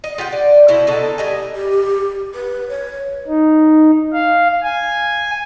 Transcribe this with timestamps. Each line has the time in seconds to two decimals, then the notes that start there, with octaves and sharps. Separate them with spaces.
0.04 D#5
0.18 F4 G4 F#5 G5
0.32 D5
0.68 B2 E4 F#4 C5
0.87 B2 D3 D#4 A4
1.18 G3 D#5 G#5
1.55 G4
2.35 B4
2.69 C#5
3.27 D#4
4.14 F5
4.63 G#5